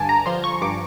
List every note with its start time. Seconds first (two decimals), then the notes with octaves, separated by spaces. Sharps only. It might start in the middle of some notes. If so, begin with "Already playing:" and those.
Already playing: G2 D3 G#5 A5 D6
0.09 A#5
0.26 F3 C6
0.44 C#6
0.62 G2 D6